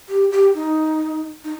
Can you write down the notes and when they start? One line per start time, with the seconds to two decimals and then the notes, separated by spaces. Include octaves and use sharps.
0.09 G4
0.31 G4
0.54 D#4
1.44 D#4